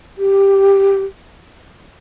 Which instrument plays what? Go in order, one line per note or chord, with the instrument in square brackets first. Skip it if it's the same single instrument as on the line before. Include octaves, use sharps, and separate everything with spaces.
[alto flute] G4